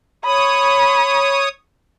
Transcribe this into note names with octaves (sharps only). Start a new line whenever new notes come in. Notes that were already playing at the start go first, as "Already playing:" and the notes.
C#5 B5 D#6